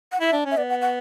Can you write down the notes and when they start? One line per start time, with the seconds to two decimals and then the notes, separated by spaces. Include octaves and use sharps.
0.12 F#5
0.20 E4 E5
0.33 D4
0.46 C#4
0.51 E5
0.57 B3 D5
0.70 F#5
0.82 F#5